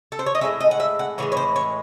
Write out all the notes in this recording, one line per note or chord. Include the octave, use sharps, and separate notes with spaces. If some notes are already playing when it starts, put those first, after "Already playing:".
A4
C5
C#5
D#5
A2 E3 G#3 E5
D#5
F#5
E5
F#5
A2 E3 G#3 C#5
C#5
C5
C#5